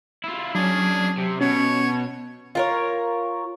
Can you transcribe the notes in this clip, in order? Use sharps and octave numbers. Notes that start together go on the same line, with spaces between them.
E4 F4
F#3 C#4 D4 G#4
C3
B2 C#4 C#5
F4 A#4 C#5